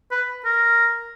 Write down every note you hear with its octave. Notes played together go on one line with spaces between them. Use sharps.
B4
A#4